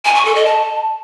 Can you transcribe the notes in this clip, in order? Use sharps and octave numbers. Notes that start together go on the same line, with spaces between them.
G#5
C#6
A4
D#5
A5